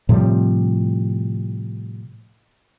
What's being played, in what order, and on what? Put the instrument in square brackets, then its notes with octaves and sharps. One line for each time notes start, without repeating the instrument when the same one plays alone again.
[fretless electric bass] A2 C3 F3 G3